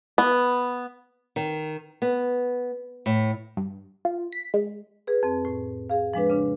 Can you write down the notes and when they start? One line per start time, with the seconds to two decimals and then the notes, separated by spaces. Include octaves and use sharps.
0.18 B3
1.36 D#3
2.02 B3
3.06 A2
3.57 G2
4.05 F4
4.33 B6
4.54 G#3
5.07 G#4 B4
5.23 F2 C4
5.45 A2
5.90 G#4 F5
6.14 F3 G#3 D4 B4
6.30 C#3 D4